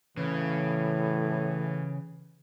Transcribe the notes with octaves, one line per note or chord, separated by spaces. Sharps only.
A2 C#3 E3